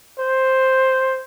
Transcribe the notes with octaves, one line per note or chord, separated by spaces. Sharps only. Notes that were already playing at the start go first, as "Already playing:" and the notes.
C5